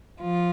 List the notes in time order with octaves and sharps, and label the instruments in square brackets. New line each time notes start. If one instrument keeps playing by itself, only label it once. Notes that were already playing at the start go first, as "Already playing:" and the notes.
[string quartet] F3 F4